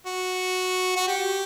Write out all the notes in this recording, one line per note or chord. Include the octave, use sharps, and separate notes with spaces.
F#4
F#4
G4